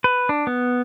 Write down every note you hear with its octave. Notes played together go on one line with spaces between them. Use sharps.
B4
D4
B3